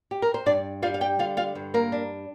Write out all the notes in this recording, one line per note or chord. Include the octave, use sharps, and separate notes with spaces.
G4
A#4
C5
G2 D4 D5
G3 F4 F5
F5
G4 G5
D3 F4 F5
F4 F5
G2
A#3 A#4
D4